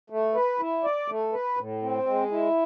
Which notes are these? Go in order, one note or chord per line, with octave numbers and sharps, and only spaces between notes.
A3
B4
E4
D5
A3
B4
A2
C4
G#3
E4